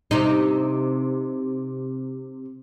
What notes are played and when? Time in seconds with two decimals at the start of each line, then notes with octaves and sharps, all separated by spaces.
0.11 C3 D#4